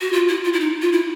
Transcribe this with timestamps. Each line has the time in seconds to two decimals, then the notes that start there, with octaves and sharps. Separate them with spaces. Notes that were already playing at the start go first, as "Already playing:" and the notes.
0.01 F#4
0.13 F4
0.29 E4
0.45 F4
0.53 E4
0.60 D#4
0.82 F4
0.92 E4